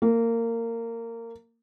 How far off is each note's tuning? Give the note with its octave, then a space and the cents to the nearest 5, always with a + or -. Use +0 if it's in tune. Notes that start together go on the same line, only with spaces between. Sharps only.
A#3 -20